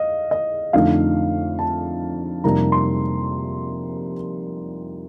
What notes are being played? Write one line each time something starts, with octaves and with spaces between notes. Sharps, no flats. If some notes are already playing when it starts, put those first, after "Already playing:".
Already playing: D#5 F5
D#5
F2 D3 A3 D#4 F5
A5
F2 C3 G3 A#3 D#4 A#5
C6